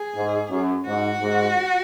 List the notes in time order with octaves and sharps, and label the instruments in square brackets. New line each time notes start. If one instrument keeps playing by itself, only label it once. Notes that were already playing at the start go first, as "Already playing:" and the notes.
Already playing: [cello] G#4
[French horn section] G#2
F#2
[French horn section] G#2 [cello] F#4
[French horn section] G#2